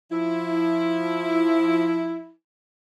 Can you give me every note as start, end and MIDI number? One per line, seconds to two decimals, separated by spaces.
0.11 2.31 53
0.11 2.31 64